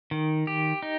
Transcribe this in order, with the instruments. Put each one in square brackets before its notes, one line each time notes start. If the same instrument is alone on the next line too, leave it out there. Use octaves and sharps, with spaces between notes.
[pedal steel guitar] D#3
G4
D#4